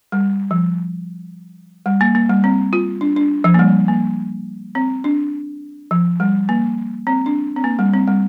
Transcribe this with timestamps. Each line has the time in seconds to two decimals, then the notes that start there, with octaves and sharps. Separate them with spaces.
0.12 G3
0.51 F3
1.86 G3
2.01 A#3
2.15 A#3
2.30 G3
2.44 C4
2.73 F4
3.01 D4
3.16 D4
3.44 F3
3.54 A#3
3.59 G3
3.88 A#3
4.75 C4
5.04 D4
5.91 F3
6.20 G3
6.49 A#3
7.07 C4
7.26 D4
7.56 C4
7.64 A#3
7.79 G3
7.93 C4
8.07 G3